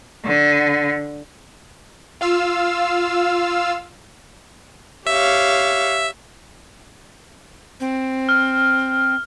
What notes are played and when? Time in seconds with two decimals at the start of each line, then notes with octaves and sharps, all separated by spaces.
0.25 D3
2.21 F4 F5 E6
5.07 G4 C#5 E5 F5
7.80 C4
8.29 F6